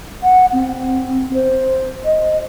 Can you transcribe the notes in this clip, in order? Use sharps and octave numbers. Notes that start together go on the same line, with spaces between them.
F#5
C4
C5
D#5